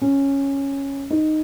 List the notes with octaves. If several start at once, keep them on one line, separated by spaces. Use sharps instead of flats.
C#4
D#4